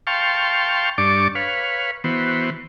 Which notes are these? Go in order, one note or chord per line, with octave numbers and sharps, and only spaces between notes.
F5 G5 A5 C6 C#6
G2 D4 D5 C#6 D6
B4 C#5 F5
E3 B3 F#4 C5